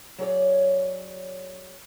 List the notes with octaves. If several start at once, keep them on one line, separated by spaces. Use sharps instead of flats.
F#3 G#4 C#5 D5